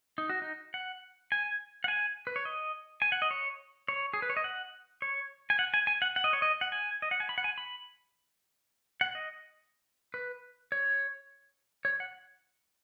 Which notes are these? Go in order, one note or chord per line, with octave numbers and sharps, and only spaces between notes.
D#4
F#4
D#4
F#5
G#5
F#5
G#5
B4
C#5
D#5
G#5
F#5
D#5
C#5
C#5
G#4
B4
C#5
D#5
F#5
C#5
G#5
F#5
G#5
G#5
F#5
F#5
D#5
C#5
D#5
F#5
G#5
D#5
F#5
G#5
B5
F#5
G#5
B5
F#5
D#5
B4
C#5
C#5
F#5